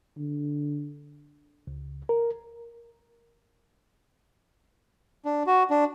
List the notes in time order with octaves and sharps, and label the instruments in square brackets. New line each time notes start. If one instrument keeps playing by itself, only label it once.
[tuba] D3
[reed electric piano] C#2
A#4
[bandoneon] D4
F#4
D4